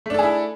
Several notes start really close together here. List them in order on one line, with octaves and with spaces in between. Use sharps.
A3 D4 A4 G#4 E4